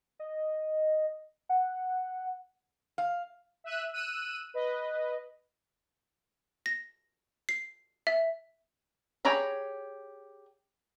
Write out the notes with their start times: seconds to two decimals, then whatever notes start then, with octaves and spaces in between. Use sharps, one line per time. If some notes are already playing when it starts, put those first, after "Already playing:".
0.19 D#5
1.49 F#5
2.98 F5
3.64 E5 E6 F#6 D#7
3.93 E6 F#6 D#7
4.54 B4 D#5
6.66 A#6
7.49 C7
8.07 E5
9.25 G4 G#4 C#5 A#5 B5